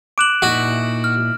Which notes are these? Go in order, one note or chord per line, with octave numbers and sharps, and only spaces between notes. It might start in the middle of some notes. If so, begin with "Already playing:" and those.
D6 F#6 D7 E7 F#7
A#2 D#4 E4 F#4
F6